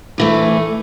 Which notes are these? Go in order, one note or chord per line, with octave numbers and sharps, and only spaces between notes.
D2 E3 A3